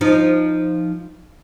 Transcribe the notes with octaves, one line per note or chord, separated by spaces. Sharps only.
F3 D#4